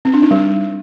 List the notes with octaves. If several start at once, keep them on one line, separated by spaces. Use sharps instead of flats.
C4
D4
D#4
G3